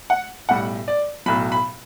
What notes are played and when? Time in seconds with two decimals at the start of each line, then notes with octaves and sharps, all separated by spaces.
0.10 F#5
0.49 B1 A2 G3 F#5
0.88 D5
1.26 B1 A2 F#3 B5
1.52 B5